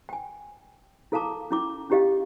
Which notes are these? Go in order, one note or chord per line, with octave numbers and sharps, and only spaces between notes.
G5 G#5
E4 A4 F5 A5 A#5 D6
C#4 E4 D6
C#4 E4 G4 D#5 F5